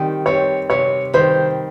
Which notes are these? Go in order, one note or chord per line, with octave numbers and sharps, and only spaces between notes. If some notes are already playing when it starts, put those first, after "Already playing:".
Already playing: D#3 G3 C4
G3 C4 C#5
C3 C#5
D#3 G3 C5